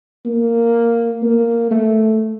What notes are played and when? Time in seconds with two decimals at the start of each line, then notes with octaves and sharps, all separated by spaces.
0.25 A#3
1.23 A#3
1.71 A3